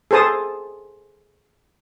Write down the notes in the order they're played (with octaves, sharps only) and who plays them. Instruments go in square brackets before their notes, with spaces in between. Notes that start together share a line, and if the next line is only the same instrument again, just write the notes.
[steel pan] G#4 A4 C5 A5 D#6